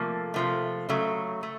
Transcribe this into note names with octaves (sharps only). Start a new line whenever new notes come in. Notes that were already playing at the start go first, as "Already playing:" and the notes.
Already playing: C3 F3 A3 A#3
C3 F3 A3
C#3 F#3 A3
A3